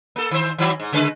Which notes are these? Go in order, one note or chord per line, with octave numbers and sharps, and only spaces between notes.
A#3 A4
D#3 C5
D#3 F#3
G#2
C#3 G#3 B4